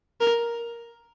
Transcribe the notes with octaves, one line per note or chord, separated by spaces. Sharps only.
A#4